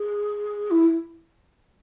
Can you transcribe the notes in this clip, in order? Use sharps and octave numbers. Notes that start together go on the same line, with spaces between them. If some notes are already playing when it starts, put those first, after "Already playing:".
Already playing: G#4
E4